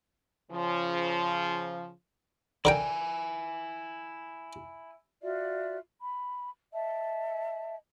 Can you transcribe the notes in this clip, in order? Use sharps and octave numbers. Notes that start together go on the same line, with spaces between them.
C#3 F3
D3 E4 A#4 G5 G#5
F4 F#4 D5 E5
B5
D#5 E5 A5